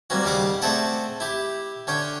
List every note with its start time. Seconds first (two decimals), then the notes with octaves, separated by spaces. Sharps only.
0.10 G3 A#3 C4 C#4 F#4
0.25 D#2 C#3 G3 F5 F#5 D6
0.62 A3 C4 G#4 A4 D5 F#5
1.20 E4 G4
1.87 D3 C#4 C#5 G5